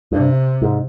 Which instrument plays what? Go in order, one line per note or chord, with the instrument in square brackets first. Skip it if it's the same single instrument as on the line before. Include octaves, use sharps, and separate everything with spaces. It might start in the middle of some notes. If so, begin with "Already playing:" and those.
[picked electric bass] G2 [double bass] C3
[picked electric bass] G#2